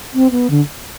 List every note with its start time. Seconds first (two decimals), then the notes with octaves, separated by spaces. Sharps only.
0.14 C4
0.31 B3
0.50 D3